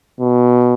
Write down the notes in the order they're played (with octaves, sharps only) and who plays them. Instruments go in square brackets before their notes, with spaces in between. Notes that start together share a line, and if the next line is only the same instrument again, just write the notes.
[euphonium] B2